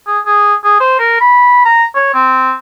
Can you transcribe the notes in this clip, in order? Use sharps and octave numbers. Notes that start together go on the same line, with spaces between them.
G#4
G#4
G#4
C5
A#4
B5
A#5
C#5
C4